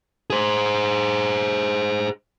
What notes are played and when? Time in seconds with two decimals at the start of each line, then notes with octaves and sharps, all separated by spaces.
0.30 G#4 C5